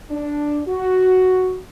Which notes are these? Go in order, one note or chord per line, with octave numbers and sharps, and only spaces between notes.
D4
F#4